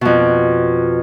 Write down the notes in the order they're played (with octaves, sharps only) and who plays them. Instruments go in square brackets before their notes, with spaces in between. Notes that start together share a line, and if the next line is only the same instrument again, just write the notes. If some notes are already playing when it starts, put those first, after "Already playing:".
[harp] F2 B2